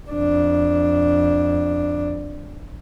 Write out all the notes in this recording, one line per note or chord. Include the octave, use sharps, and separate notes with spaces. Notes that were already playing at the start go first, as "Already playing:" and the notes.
F2 D4